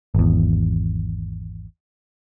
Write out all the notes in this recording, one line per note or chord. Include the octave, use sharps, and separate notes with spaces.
G#1 E2